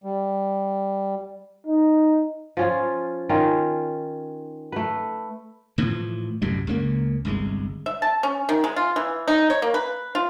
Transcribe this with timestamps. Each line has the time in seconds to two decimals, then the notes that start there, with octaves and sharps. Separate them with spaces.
0.04 G3
1.67 D#4
2.57 F3 C#4 F4
3.29 D#3 C#4 F4
4.72 A3 B4
5.78 A2 E3 F3
6.42 C2 F#2 A2 G3
6.67 C#2 C#3 A#3
7.25 G1 C2 G#3
7.86 E5
8.02 A5
8.23 C#4
8.49 D#3
8.64 G#3
8.76 F4
8.96 E3
9.28 D#4
9.50 C#5
9.62 A#3
9.74 B4
10.15 F4